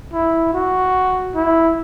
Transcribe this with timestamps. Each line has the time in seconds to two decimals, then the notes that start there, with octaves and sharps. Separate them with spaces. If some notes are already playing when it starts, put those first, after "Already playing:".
0.13 E4
0.54 F#4
1.35 E4